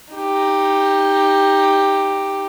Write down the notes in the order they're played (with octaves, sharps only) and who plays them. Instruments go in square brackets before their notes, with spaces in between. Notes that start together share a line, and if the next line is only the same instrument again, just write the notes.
[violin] D#4 G4